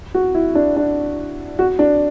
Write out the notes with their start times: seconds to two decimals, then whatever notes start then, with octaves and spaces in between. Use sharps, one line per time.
0.15 F#4
0.34 E4
0.55 D4
0.76 D4
1.59 F#4
1.79 D4